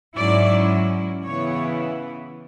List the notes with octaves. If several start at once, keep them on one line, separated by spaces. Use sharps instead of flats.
G#2 F#3 C#4 E4 D5
C#3 E3 B3 E4 C#5